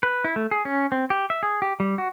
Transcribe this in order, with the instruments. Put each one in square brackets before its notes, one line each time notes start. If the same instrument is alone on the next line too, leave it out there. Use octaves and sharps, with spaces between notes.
[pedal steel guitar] B4
E4
A3
G#4
C#4
C4
G4
E5
G#4
G4
G3
F#4